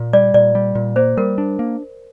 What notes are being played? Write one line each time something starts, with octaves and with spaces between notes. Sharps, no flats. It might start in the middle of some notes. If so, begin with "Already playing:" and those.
Already playing: A#2
G3 D5
A#2 D5
G3
A#2
A#3 C5
G3 A#4
D4
A#3